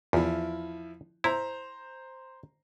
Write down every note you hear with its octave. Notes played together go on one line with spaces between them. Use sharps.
E2 F3 E4
E4 C5 A#5